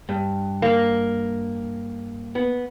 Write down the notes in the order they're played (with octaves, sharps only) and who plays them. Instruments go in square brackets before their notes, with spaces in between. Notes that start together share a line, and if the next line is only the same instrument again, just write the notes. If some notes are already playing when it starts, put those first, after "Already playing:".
[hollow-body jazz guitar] G2
[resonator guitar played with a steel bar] A#3
[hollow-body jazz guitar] B3